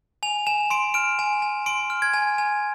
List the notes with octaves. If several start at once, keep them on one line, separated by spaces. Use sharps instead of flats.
G#5 F7
G#5 E7
C6 D7
F6 D7
G#5
G#5
C6 D7
F6
G#6
G#5
G#5